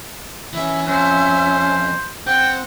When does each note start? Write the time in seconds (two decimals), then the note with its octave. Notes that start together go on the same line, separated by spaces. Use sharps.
0.53 E3 C#4 E4 E5
0.87 F2 C#4 C5
2.27 C4 F#5 G5